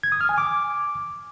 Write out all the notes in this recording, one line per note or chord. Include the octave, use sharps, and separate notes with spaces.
G#6
D#6
F6
G#5
D6